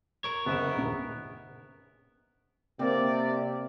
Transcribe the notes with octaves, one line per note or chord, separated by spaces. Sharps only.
A#4 C#5
F#1 B3 E5 E7
D#1 A#1
C3 A#3 C4 D5